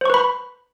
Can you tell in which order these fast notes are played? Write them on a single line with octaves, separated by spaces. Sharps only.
C5 C#6 B4 B5